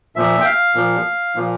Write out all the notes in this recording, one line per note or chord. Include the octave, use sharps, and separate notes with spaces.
A#2 F3 A#3 E5
G5
F5
A#2 F3 A#3
A#2 F3 A#3